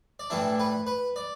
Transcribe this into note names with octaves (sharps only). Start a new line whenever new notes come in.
D5
A2 E3 G3 D4 E5
B4
B4
D5